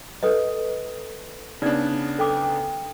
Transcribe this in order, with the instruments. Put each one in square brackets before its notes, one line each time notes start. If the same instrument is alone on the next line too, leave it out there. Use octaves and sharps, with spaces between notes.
[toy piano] A4 B4 D#5
[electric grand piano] C#3 B3 D4 [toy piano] D#4 D5
[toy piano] A4 G5 D6